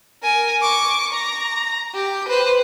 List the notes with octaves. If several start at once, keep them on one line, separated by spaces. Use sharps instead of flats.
A#4 G#5
C#6 D6
A#5
G4
B4 C5